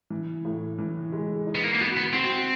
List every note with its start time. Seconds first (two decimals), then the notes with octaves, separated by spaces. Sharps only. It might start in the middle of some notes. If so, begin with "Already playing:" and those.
0.10 E3
0.45 A2
0.79 E3
1.13 G#3
1.47 D#4
1.55 B3
1.64 A#3
1.75 A#3
1.80 B3 F#4
1.97 B3
2.13 C4 F#4